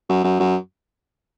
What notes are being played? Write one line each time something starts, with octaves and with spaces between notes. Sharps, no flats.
F#2
F#2
F#2